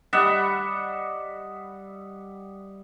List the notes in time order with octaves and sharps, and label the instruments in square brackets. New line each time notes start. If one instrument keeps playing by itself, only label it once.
[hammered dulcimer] G3 D#5 E5 F#5